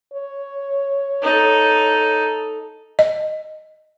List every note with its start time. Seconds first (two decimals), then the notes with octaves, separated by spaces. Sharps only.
0.14 C#5
1.22 D#4 A4
2.99 D#5